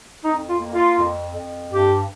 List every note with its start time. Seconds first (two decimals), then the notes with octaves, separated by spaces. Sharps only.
0.23 F2 D#4
0.48 F4
0.60 A#3
0.73 F4
0.97 F2
1.33 F2
1.70 G2 G4